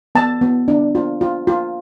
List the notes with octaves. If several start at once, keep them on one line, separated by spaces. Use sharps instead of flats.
B3 A5
B3
D4
F4
F4
F4